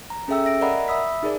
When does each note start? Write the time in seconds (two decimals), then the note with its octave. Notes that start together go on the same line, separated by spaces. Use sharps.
0.10 A#5
0.28 C#4 G#4 A4 E5 G5 E6
0.45 E5 A#6 D7
0.61 A#4 D5 D#5 F#5 A#5 B5
0.88 E5 B5 D#6 E6 B6
1.23 D#4 G#4 A#4 D5